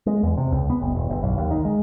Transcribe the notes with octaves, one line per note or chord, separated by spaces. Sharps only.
G#3
E2
C3
C#2
B3
F#1
E1
G1
B1
D#2
D#3
G#3